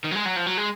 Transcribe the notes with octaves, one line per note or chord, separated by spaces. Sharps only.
D#3
F#3
G#3
F#3
F3
F#3
G#3